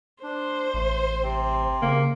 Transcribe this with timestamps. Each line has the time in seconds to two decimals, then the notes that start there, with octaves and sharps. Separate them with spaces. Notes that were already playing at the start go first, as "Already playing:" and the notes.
0.23 D4 C5
0.74 A1 A3
1.23 C3 C4
1.82 C#3 A#3